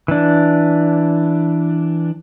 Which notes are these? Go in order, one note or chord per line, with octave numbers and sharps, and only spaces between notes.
E3 D4